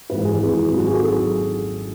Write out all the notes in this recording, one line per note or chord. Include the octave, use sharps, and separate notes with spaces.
G#1 G#2 E3 G#3 B4
G#4
G#1 G#2 E3 G#3
G#1 G#2 F#3
F#4
G#4
F#3 A4